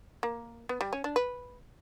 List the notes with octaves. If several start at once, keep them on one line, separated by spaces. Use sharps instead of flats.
A#3
B3
G3
C#4
D4
B4